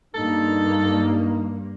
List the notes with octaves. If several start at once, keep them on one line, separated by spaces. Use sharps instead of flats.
G2 A#3 D#4 A4